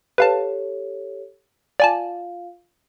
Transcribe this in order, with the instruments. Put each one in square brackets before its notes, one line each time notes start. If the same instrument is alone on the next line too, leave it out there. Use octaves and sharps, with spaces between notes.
[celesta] G4 A4 C#5 [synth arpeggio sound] B4 F5 A5
[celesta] F4 F5 [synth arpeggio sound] D5 G#5 A5